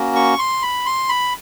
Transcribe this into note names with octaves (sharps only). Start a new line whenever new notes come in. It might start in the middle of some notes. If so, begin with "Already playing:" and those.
Already playing: A#3 C#4 F#4
C#6
C6
B5
C6
B5